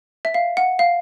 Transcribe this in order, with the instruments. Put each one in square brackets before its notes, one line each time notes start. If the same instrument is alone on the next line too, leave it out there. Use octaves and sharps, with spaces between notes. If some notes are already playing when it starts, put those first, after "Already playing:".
[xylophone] E5
F5
F#5
F5